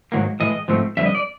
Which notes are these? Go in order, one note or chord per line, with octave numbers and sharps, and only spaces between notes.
G#2 D#3 F#3 A#3
A2 E3 G#3 D#5
G#2 F3 A3 C4
F2 D3 G3 E5
D#5
D5